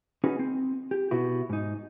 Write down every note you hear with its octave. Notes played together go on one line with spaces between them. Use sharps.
C#4 D#4 F#4 G#4 B4
C4
G4
B2 B3 E4 F#4
G#2 D#4